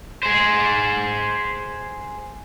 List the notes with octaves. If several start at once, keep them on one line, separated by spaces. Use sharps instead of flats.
G#4 C5